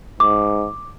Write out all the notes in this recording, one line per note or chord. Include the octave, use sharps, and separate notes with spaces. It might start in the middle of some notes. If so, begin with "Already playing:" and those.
G#2 D6